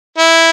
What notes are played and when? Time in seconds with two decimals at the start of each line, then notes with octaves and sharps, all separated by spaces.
0.18 E4